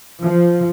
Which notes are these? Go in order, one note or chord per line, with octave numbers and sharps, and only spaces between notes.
F3